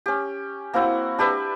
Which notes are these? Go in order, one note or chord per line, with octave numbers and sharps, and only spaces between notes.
C#4 G4
A#3 C4 E4 F#4
D4 G4 B4 E5